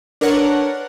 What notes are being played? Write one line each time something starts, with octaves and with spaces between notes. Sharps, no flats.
D4 A#4 B4 C#5 F#5